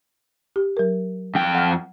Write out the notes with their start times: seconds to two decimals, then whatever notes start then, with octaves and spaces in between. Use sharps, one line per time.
0.56 G4
0.77 F#3 A#4
1.35 F2 G5
1.55 F#5 F6